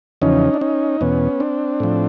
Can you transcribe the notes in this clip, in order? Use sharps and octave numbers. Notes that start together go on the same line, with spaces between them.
E2 C#3 F3 C#4 D#4
D4
C#4 D#4
E2 B2 B3 C#4
C4 D4
A2 F3